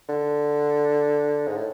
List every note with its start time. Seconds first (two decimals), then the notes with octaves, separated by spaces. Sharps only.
0.09 D3
1.47 G#2
1.57 A2